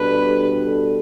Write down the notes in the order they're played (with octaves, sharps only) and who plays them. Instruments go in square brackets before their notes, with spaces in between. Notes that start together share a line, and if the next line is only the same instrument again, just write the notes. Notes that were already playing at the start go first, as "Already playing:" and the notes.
Already playing: [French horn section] B2 G3 D4 A4 [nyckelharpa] B4